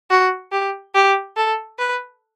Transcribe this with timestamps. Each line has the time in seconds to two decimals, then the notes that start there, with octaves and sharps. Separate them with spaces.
0.10 F#4
0.52 G4
0.95 G4
1.37 A4
1.79 B4